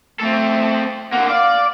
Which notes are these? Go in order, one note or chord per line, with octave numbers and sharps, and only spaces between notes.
A3 C4 A4
D3 A#3 F#5
D5 F5